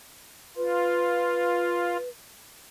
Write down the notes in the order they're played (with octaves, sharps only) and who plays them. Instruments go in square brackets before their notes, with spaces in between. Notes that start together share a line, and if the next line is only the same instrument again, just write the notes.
[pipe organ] F4 [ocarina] B4